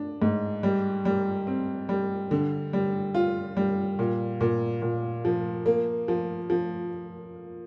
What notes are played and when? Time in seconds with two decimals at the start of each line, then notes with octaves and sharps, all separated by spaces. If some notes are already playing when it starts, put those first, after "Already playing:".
Already playing: D4
0.22 G#2
0.63 G3
1.05 G3
1.47 C4
1.89 G3
2.31 D3
2.73 G3
3.15 F4
3.57 G3
3.99 A#2
4.41 A#2
4.82 A#2
5.25 F3
5.66 A#3
6.08 F3
6.50 F3